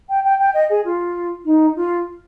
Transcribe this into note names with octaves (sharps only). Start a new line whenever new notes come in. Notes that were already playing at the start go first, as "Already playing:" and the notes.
G5
G5
G5
D#5
G#4
F4
D#4
F4